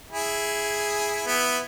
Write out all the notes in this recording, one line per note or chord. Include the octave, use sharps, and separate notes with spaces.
E4 G#4
B3 E4